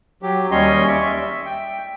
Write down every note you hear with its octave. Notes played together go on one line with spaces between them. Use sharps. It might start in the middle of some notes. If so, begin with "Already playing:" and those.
F#3 G4
D#2 G3 C#4 C#5 D#5 C6
D5 E5 C#6
E5
G5